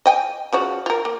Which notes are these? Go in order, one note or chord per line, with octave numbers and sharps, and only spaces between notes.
D#5 G5 G#5
C#3 F3 F#4
F4 A#4
A#3